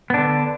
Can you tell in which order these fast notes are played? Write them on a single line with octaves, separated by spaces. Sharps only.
B3 D4 D3